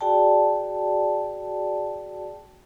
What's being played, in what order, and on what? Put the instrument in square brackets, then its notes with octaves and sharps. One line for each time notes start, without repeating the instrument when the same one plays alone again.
[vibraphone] F#4 G#4 D5 G5 A5